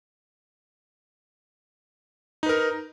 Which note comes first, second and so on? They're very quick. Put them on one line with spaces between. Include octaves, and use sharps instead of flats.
D#4 B4 A#4